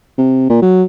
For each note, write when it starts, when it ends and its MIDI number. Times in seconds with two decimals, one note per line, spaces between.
0.18 0.49 48
0.49 0.60 46
0.62 0.83 54